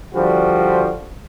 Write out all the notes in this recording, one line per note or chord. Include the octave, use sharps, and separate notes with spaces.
D3 F3 G3 F#4